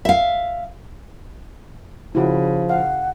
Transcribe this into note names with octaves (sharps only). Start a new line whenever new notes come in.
E5 F5
C#3 F3 E4 F#4
F5 F#5